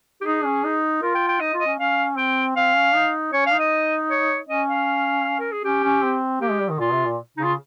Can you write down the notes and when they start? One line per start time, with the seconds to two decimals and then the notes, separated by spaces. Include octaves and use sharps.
0.21 G4
0.25 D#4 G#4
0.44 C#4
0.64 D#4
1.02 F4 A#4
1.15 G5
1.29 G5
1.40 D#4 D#5
1.54 F4
1.60 D#5
1.66 C#4
1.79 C#4 F5
2.18 C4 G5
2.56 C4 F5
2.76 C#4
2.95 D#4
3.33 C#4 C#5
3.46 F5
3.53 D#4
3.59 D#5
4.11 C#5
4.49 C#4 D#5
4.69 F5
5.40 A#4
5.52 G#4
5.64 C#4 G4
5.84 C#4
6.03 C4
6.41 A#3 G4
6.51 G#3
6.61 G3
6.70 D#3
6.80 A#2 F4
6.93 C3
7.05 A#2
7.37 C#3 D#4
7.44 F4